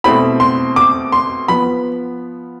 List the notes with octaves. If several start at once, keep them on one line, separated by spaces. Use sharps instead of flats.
B2 A3 C4 E4 B5
C6
D6
C6
F3 B3 B5